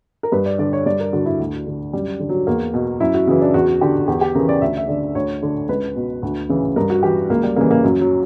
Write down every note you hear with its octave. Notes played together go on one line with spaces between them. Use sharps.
A#4
G2 B4
D5
D3 D5
C#5
G2 D5
A#4
D3 F#4
E4
D2
D3
F#2 G3
D3
F#3
E2 A#3
B2
F#2 E4
F#4
C#3 E3 F#4
D4
E2 F#4
D3 G4
E2 G4
G4
C#3 E3 A#4
D5
D2 E5
E5
D3 D5
D2 C#5
D3
C#2 B4
B2
D2
C#3 E3
G2 A#4
F#4
E3 G4
C#2 A#3
G3
C#3 E3 A#3
A#3
F#2 F#3
F#3